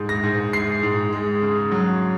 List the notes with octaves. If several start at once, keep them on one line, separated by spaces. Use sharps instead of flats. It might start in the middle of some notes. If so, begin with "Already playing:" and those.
Already playing: G#2 G#3
A#6
G#2
G#3 C7
G#2
G#3
C#3
F#3